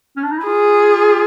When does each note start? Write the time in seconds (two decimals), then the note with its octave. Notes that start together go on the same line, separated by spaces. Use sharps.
0.17 C#4
0.24 D4
0.32 D#4
0.38 E4
0.46 F4 G#4